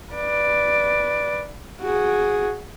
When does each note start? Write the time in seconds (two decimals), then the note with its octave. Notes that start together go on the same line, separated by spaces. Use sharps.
0.13 B4 D5
1.81 F#4 G#4